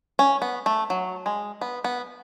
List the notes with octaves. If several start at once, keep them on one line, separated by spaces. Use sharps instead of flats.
C#4
B3
A3
F#3
G#3
B3
B3